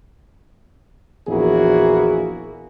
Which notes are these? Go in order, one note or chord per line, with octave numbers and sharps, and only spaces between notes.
A#1 E2 A#3 E4 F#4 G#4